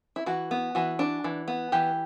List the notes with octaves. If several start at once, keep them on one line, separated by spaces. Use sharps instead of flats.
E4
E3 F#4
B3
E3 F#4
D4
E3
B3
E3 G4